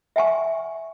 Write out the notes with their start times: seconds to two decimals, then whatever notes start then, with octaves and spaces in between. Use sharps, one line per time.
0.16 E5 F#5 G#5 C#6